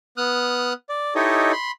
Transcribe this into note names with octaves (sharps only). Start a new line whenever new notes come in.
B3 D#6 F6 F#6
D5
D#4 E4 G4 A4 C#5 D#5
B5 C6